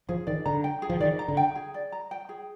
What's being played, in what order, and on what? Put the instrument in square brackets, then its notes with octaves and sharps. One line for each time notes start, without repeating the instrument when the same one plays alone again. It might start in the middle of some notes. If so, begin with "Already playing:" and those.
[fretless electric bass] F3 [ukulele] G#4
[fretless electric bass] D#3 [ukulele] D5
[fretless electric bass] D3 [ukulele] A#5
[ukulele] G5
G#4
[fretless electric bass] F3
[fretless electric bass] D#3 [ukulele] D5
[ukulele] A#5
[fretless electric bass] D3
[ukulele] G5
G#4
D5
A#5
G5
G#4